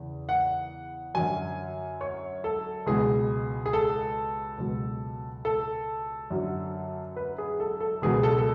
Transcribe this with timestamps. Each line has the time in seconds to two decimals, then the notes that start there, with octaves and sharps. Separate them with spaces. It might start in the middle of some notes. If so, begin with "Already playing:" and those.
Already playing: E2 C#3 E3
0.29 F#5
1.14 F#2 D3 F#3 G#5
2.01 C#5
2.44 A4
2.86 C#2 B2 F#3 G#4
3.66 G#4
3.73 A4
4.58 C#2 B2 F#3
5.45 A4
6.30 F#2 D3 F#3
7.17 B4
7.38 G#4
7.60 A4
7.80 A4
8.02 C#2 B2 F#3 G#4
8.23 A4
8.38 A4